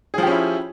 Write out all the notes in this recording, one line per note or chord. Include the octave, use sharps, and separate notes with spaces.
F3 C#4 E4 G4 G#4